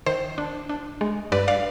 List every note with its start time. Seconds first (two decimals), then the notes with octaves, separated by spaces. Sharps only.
0.06 D#3 C5
0.38 D4
0.69 D4
1.01 G#3
1.32 G2 B4 D5
1.48 D5 F5